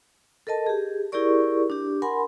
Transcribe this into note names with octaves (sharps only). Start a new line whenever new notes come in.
A4 A#4 D#5 A5
G4 G#4
E4 G4 G#4 A#4 D5 C#6
D4 G4
A#4 F#5 G#5 B5 C6